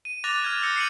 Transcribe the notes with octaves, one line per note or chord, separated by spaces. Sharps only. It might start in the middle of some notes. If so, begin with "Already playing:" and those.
D#7
D6 F#6 A6 A#6 F7
F6 G#6 D#7
E6 F#6 G6 A#6 C#7
C7 C#7 D#7 F#7